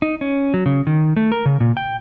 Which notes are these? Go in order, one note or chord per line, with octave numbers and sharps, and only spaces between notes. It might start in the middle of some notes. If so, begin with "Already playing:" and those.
D#4
C#4
F#3
C#3
D#3
A3
A#4
C#3
A#2
G5